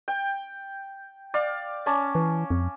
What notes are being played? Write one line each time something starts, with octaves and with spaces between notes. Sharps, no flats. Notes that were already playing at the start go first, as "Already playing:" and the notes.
G5
D5 F5
C#4 A5 D6
E3
F2